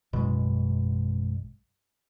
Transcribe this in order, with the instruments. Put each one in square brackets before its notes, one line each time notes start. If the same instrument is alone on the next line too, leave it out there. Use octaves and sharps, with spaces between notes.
[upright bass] A1 F#2 [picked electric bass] B2 G#3